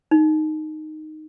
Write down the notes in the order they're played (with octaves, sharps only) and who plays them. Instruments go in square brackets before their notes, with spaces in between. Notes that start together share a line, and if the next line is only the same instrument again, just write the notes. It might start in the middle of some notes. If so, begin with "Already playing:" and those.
[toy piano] D#4